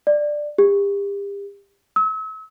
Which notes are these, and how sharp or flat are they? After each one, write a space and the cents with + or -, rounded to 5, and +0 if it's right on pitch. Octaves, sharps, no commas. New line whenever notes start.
D5 +10
G4 +35
E6 -40